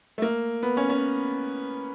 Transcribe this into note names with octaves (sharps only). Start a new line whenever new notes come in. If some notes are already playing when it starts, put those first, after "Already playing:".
A3
A#3
B3
C#4
C#4